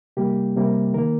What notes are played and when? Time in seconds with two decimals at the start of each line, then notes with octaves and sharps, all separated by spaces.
0.17 C3 G3 A#3 G4
0.56 C3 G3 A#3
0.94 D#3 A#3 A#4